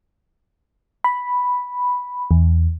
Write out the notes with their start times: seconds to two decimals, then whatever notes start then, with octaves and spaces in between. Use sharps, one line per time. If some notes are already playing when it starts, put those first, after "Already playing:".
1.04 B5
2.31 E2